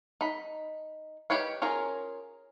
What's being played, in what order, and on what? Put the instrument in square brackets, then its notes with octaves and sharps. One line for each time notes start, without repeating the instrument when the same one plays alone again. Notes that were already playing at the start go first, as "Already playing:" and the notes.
[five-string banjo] D#4 B5
D#4 G4 B4 C#5 F5
C#4 F4 G#4 A#4